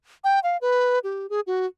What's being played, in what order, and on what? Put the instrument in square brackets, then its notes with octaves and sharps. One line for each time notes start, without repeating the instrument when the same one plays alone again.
[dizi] G5
F5
B4
G4
G#4
F#4